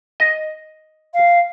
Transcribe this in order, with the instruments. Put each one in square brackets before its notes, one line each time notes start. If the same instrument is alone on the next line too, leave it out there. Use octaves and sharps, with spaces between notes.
[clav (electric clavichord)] D#5
[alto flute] F5